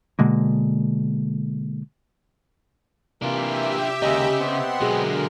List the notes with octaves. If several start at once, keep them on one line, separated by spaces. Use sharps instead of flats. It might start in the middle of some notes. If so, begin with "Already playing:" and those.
B2 D3 G#3 A#3
C3 E3 A#3 D4 F4 G4 E5
D#2 C#3 G#3 D#5 A#5
B3 C4 F#5 C6
B2 D3 F#3 G#3 G#4 A#4